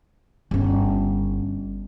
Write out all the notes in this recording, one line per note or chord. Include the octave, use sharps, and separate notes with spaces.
G1 C#4